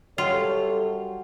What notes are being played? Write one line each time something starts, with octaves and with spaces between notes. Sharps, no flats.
F#2 F#3 G3 F4 A4 C#5 G5 C6